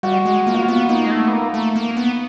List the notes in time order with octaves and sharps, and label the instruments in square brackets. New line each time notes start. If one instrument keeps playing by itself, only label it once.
[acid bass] G3 [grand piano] F#4
[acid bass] G#3
[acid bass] A#3 [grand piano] F4
[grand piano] F#4
F4
[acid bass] B3 [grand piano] F#4
[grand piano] F4
[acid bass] A#3 [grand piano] D#4
[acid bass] G#3
A3
B3
A#3
A3
A#3
B3